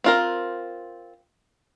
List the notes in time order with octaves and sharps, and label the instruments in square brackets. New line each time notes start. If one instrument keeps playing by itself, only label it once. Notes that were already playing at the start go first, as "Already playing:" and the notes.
[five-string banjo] C4 F4 A#4